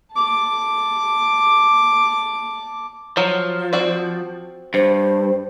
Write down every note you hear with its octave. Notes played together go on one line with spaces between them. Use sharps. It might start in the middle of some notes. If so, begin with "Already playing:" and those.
A5 D6
F3 F#3
C4 F#4 D5
G2 C5